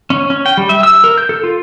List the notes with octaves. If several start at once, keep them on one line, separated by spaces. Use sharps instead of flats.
C#4
C#4
G5
G3
E5
E6
A#4
G6
A4
F4